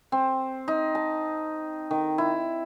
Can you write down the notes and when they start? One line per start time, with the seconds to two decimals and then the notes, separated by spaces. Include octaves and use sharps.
0.12 C4
0.68 D#4
0.95 A5
1.91 D#3
2.18 E4